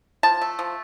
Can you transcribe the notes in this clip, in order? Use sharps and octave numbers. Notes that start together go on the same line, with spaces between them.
F3 A5
A3
F3